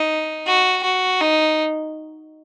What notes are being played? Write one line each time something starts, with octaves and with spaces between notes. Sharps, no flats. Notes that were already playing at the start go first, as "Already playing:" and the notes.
Already playing: D#4
F#4
F#4
D#4